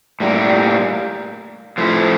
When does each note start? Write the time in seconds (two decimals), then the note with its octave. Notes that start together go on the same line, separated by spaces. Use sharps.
0.20 A2 G3 A#3
1.78 F3 A3 E4